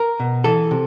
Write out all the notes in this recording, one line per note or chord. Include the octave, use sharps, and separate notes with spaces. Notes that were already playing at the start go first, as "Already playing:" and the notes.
Already playing: A#4
B2
E3 A4
C3